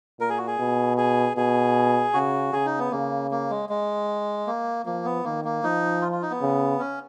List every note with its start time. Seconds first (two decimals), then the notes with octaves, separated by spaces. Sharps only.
0.19 A#2 A#4
0.30 G#4
0.38 F#4
0.47 G#4
0.59 B2
0.98 G#4
1.37 B2 G#4
2.14 C#3 F#4
2.53 C#3 G#4
2.66 D#4
2.79 B3
2.91 C#3 A#3
3.31 A#3
3.50 G#3
3.69 G#3
4.47 A#3
4.85 F3 A#3
5.04 B3
5.24 D#3 A#3
5.44 A#3
5.63 F3 D#4
6.02 F4
6.12 F4
6.22 D#4
6.31 B3
6.41 C#3
6.79 C#4